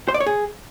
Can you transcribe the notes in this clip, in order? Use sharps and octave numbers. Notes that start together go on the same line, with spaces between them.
C5
D5
C#5
G#4